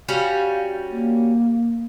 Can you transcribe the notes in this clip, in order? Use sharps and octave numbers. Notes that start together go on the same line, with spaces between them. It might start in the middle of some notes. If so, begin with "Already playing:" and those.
G3 C#4 F#4 F5
A#3